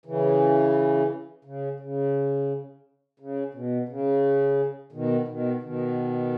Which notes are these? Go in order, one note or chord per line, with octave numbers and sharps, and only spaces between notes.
C#3 E3
C#3
C#3
C#3
B2
C#3
B2 D#3
B2 D#3
B2 D#3